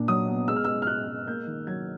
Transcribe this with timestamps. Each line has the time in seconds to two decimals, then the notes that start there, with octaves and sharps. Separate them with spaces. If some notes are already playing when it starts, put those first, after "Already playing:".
Already playing: A#2 D4
0.08 F#3 D#6
0.28 B3
0.48 G#3 E6
0.56 F6
0.64 G#3 E6
0.82 F6
0.87 G#3 F#6
1.07 G#3
1.27 A#3 G6
1.47 D#3
1.67 F#3 G#6